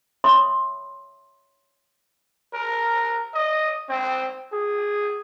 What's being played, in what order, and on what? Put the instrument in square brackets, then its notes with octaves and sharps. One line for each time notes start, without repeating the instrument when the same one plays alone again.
[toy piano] C#5 D#5 E5 B5 C6 D#6
[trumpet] A#4
D#5
C4
G#4